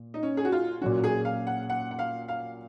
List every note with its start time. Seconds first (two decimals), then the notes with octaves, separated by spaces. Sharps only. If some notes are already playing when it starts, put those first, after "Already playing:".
Already playing: A#2
0.14 D#4
0.23 C#4
0.37 G#4
0.45 F#4
0.52 F4
0.81 A#2 F#3 C#4 F#4
1.04 G#4
1.25 F5
1.47 F#5
1.70 F#5
1.91 F#5
1.99 F5
2.28 F5